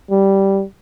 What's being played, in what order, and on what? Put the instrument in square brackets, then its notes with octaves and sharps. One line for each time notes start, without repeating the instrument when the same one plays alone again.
[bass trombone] G3